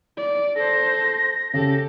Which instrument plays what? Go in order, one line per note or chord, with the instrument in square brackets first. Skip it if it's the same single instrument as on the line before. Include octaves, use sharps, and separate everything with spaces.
[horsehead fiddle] D5
[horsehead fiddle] A4 C5 [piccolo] A#6
[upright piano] C#3 [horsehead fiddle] G4 A4